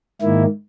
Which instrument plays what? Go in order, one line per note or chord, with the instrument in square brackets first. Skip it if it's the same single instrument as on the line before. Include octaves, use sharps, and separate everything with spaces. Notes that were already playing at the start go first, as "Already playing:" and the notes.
[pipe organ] G#2 D#3 A#3 E4